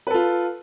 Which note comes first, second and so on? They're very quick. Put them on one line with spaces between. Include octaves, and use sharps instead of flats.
B4 A4 F4